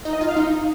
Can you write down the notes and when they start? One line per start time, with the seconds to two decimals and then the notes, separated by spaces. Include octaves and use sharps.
0.05 D#4
0.13 D#5
0.21 F4
0.29 F5
0.37 D#4